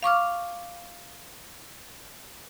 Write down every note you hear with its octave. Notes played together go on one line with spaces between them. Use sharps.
F5 C#6 D6 F6